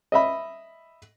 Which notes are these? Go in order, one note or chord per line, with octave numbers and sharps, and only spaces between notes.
D#5 E5 B5